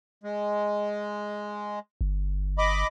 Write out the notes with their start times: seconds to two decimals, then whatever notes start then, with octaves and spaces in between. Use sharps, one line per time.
0.23 G#3
2.01 G1
2.58 D#5 B5 D6